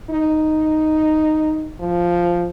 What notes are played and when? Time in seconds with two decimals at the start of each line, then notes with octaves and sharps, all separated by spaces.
0.10 D#4
1.80 F3